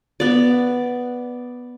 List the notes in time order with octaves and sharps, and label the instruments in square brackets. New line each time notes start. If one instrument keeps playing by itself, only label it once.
[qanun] B3 D5